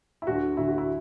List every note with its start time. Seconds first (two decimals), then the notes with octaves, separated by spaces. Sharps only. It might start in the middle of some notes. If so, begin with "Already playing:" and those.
0.22 E4
0.27 D2 D3 F#4
0.57 D2 D3 E4
0.68 F#4
0.78 E4